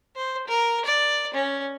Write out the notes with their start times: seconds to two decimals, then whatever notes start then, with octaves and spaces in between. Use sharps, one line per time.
0.16 C5
0.47 A#4
0.86 D5
1.34 C#4